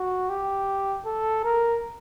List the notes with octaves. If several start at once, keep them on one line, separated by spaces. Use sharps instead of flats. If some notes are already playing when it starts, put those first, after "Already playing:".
Already playing: F#4
G4
A4
A#4